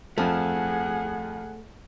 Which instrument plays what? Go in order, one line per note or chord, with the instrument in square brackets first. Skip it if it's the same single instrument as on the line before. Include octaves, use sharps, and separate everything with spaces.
[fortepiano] F2 F3 [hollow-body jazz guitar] A3 [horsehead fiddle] G#4 F#5